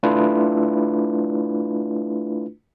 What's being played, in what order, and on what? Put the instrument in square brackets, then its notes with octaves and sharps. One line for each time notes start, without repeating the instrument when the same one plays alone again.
[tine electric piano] A3 D4 E4 F4 B4